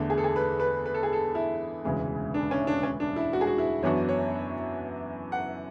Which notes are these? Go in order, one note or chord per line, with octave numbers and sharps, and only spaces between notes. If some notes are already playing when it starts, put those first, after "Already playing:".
Already playing: E2 D3 A3
G#4
A4
G#4
B4
B4
B4
A4
G#4
A4
E4
E1 D2 C#3 E3 G#3
D4
C#4
D4
C#4
D4
E4
F#4
G#4
F#4
E4
F#2 E3 B3 D4 F#4 C#5
C#5
F#5